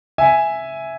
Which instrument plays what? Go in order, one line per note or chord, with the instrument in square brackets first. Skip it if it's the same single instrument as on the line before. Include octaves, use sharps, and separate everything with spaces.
[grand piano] E5 G#5